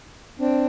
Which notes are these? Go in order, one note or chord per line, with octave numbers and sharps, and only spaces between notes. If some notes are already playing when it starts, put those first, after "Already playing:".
C4 D4